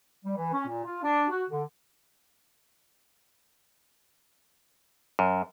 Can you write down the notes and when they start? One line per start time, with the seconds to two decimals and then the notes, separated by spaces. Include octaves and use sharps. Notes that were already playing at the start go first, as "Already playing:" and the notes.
0.24 G3
0.36 E3
0.52 C#4
0.66 A#2
0.84 F4
1.03 D4
1.29 F#4
1.50 D3
5.19 F#2